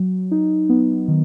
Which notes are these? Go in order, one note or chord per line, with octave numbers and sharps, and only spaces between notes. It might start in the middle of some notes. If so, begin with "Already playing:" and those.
Already playing: F#3
D#4
B3
D#3